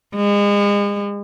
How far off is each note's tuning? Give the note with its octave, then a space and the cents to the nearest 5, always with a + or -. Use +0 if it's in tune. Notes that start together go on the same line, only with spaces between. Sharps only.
G#3 -35